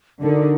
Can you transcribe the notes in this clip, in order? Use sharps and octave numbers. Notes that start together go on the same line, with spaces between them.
D3 D#4 F#4 A#4